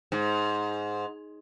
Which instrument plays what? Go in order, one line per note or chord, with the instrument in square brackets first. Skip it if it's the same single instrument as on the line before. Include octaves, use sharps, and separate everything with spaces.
[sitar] G#2